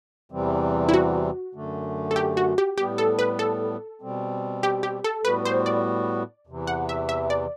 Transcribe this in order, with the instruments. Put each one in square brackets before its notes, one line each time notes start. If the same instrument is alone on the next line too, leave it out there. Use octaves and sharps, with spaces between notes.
[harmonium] E2 C3 E3 G3 C4
[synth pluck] E4
F#4
[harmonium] F#2 D3 A3
[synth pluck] A4
G4
F#4
G4
[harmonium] A2 G3 B3 [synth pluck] G4
[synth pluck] A4
B4
A4
[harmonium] B2 G3 C4
[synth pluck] G4
G4
A4
[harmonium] A2 G3 B3 F#4 [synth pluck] B4
[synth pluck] C5
D5
[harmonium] E2 C3 E3
[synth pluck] F#5
E5
E5
D5